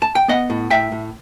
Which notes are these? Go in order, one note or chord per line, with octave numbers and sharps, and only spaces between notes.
A5
G5
B3 D#5 F#5
A2
A2 E5 G5
A2